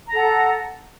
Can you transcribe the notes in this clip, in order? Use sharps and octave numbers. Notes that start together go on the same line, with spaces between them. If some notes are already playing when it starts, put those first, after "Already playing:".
A4 F#5 A#5